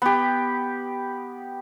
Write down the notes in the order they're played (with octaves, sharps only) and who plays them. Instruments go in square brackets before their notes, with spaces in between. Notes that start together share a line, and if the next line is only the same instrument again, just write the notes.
[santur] B3 G4